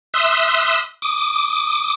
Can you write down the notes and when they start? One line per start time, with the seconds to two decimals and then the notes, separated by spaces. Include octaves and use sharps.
0.14 E5 C6 D#6 E6 F#6
1.02 D6 D#6